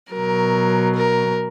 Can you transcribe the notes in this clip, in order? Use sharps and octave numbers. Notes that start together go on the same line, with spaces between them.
B2 F#3 A#4
A#4